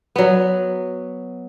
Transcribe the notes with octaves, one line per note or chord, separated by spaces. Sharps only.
F#3 B3